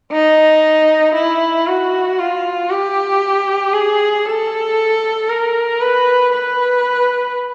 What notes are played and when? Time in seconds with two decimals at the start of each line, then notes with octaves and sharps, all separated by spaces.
0.12 D#4
1.14 E4
1.67 F#4
2.19 F4
2.70 G4
3.73 G#4
4.26 A4
5.29 A#4
5.81 B4
6.33 B4